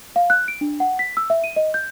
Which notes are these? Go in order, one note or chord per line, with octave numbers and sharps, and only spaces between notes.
F5
F#6
D7
D4
F#5
B6
E6
E5
D#7
D#5
G6